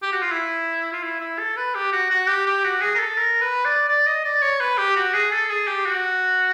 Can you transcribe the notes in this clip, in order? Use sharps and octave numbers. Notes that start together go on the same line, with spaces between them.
G4
F#4
F4
E4
F4
E4
E4
A4
B4
G4
F#4
F#4
G4
G4
F#4
G#4
A#4
A4
A#4
B4
D5
D5
D#5
D5
C#5
B4
G4
F#4
G#4
A4
G#4
G4
F#4